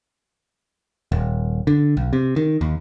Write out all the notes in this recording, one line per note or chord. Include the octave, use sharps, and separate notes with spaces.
D#1
D3
B1
C3
D#3
D#2